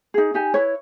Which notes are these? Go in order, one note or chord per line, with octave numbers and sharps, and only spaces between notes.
D#4 G#4
D#4 G4 G#5
E4 B4 C#5